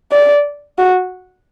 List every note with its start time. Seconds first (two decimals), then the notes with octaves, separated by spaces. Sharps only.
0.12 D5
0.78 F#4